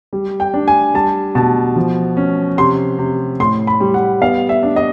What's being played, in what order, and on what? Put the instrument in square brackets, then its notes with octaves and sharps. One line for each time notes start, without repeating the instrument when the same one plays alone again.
[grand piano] G3
[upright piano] G5
[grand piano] D4
[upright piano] G#5
[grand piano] G3 [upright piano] A5
[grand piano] B2 [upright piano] A5
[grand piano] F3
C#4
[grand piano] C3 [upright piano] C6
[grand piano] C3
[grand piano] A2 [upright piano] C6
[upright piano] B5
[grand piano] G3
[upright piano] F#5
[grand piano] B3 [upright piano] F5
[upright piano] E5
[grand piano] D4
[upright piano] D#5